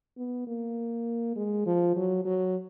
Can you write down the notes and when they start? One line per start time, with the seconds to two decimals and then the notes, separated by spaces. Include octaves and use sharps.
0.18 B3
0.47 A#3
1.36 G#3
1.66 F3
1.96 F#3
2.25 F#3